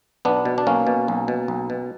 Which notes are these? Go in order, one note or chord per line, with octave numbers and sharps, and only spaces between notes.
B1 B3 D4
B2
D4
B1 A#3 C#4
B2
B1
B2
B1
B2